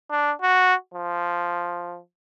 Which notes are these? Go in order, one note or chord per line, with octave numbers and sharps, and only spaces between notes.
D4
F#4
F3